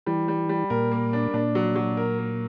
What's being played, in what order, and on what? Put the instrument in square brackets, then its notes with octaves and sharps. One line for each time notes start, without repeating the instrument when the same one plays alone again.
[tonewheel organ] E3 [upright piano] G3
[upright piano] G3
G3
[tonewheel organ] A#2 [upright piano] A#4
[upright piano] A#3
D4
[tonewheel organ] A#2 [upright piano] D4
[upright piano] F#3
F#3
A#4
A#3